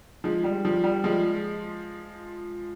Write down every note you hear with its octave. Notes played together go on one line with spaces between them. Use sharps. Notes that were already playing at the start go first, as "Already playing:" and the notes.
F3 G#3
G3
F3
G3
F3 G#3